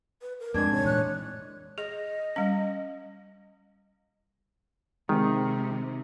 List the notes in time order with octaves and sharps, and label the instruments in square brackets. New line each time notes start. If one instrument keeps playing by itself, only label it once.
[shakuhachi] B4
A#4
[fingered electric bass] F2 [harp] G#2 C4 D4 [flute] G#6
[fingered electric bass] C3 [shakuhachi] C#5
[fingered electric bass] A#2 E3 [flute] F#6
[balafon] G#4 [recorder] D#5
[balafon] G3 C#4
[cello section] C3 [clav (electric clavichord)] D#3 [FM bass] G#3